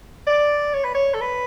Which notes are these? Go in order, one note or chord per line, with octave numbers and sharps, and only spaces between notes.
D5
C#5
B4
C#5
A4
B4